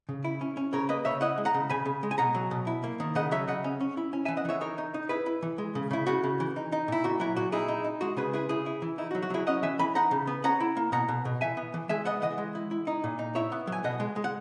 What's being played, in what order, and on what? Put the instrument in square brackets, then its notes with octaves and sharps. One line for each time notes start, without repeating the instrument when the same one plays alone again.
[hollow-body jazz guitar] C#3
E4
C#4
C#4
C#3 A#4 C#5
A#3 B4 D#5
C#3 C#5 E5
E4 D#5 F#5
G#3
F#5 A#5
C#3
C#3 G#5 B5
C#3
G#3
G#5
B2 F#5 A#5
F#3
B2
E4
A#3
D#3
C#3 D#5 F#5
F#3 C#5 E5
C#3 D#5 F#5
C#4
C#4
E4
C#4
E3 E5 G#5
D#5 F#5
E3 C#5 E5
D#4 A#4 C#5
D#4
D#4
E4 G#4 B4
E4
E3
G#3
C#3
C#3 E4
C#3 F#4
C#3
E3
D#4
D#4
A#2 E4
A#2 F#4
F#3 E4
A#2 F#4
D#4 E4 G#4
D#4
D#4
G#3 F#4
C#3 G#4 B4
E4 G#4 B4
C#3 E4 G#4
E4
E3
D#4 E4
F#4
F#3
F#4
F#3 E4 G#4
C#4 D#5 F#5
E3 E5 G#5
E3 G#5 B5
D#4 F#5 A#5
C#3
B3
C#4 F#5 A#5
E4
A#3
B2 F#5 A#5
B2
B2
E3 E5 G#5
B3
E3
G#3 E5 G#5
B3 D#5 F#5
E3 D#5 F#5
G#3
E4
E4
D#4
A#2
D#4
E4 C#5 E5
B3
F#3
G#5
B2 D#5 F#5
G#3
G#3
F#5